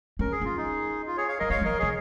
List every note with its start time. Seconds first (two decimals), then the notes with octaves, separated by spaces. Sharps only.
0.19 C#4 A#4
0.32 G#4
0.41 C#4 F4
0.57 D#4 G#4
1.07 F4
1.17 G#4 C#5
1.28 C#5 F5
1.39 F3 A#4 D#5
1.50 G#3 C#5 F5
1.61 F3
1.65 A#4 D#5
1.79 C#3 G#4 C#5